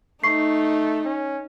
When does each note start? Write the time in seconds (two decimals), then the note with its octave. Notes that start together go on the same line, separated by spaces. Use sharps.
0.24 A3 D#4 C#6 C7
1.05 C#4